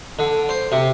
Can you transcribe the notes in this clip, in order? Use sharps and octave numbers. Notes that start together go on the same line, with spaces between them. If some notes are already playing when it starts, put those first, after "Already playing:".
D3
C5
C3